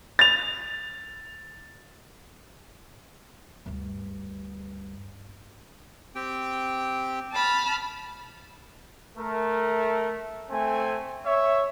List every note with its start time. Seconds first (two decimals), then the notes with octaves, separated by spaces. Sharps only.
0.19 A6 F7
3.66 D2 G2
6.15 C4 G4 G5
7.33 A5 B5 F6
9.17 A3 A#4
10.50 A3 C4 G#5
11.25 C#5 E5